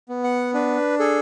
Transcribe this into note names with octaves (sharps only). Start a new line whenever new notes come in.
B3
F#5
D4 B4
G#4 A4